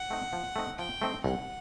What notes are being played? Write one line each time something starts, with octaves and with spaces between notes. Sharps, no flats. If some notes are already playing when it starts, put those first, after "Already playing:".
Already playing: F#5
A3 C4 D#4
F3
A3 C4 D#4
F3 G5
A3 C4 D#4
C2 F#5